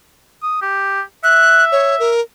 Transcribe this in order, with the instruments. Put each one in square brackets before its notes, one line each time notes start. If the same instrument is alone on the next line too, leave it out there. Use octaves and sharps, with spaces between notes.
[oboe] D#6
G4
[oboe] E5 [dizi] F#6
[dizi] C#5
A#4